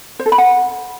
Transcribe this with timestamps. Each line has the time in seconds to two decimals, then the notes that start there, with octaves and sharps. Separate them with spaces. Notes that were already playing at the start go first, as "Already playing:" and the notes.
0.19 C5
0.26 A4
0.32 B5
0.38 F#5